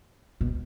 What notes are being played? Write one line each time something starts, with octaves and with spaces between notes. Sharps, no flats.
B2